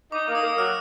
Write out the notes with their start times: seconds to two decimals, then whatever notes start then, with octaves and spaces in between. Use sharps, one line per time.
0.12 D#4 D6
0.28 A#3
0.35 D#6
0.43 A#3
0.58 F#3 F6